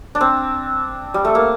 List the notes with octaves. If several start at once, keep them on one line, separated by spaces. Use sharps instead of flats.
D4
C4
G3
A3
A#3